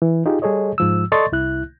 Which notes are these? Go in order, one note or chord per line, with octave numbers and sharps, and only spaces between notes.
E3
D#4 F4 G4 G#4
G3 G#4 A4 C#5 D#5
G#2 F3 E6
A4 D5 D#5 C6 C#6 A6
C2 E4 F#6